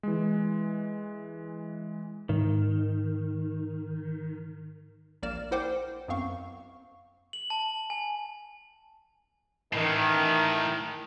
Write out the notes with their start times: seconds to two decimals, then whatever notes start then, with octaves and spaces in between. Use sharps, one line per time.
0.03 E3 G#3
2.29 G#2 D#3
5.22 A#1 A#3 D5 F6 E7
5.51 E4 A#4 C5 F#5 G5 D6
6.08 F#2 B3 C4 F5 C#6
7.33 F#7
7.50 A5
7.90 G#5
9.73 A2 D#3 E3